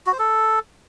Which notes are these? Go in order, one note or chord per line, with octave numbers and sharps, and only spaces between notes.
F#4
C5
A4